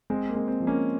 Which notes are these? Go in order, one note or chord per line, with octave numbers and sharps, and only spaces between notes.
G#3 C4
A#3
G#3
C4
F3
A#3 C#4